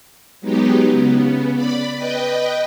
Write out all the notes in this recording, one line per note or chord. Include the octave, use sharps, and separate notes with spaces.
F#3 G#3 B3 D#4 G4
C#3 B3
D5 B5
B4 D#5 G5